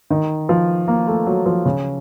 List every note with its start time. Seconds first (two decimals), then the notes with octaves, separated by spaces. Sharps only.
0.10 D#3
0.49 F3
0.88 A#3
1.08 A3
1.26 F#3
1.46 F3
1.65 C#3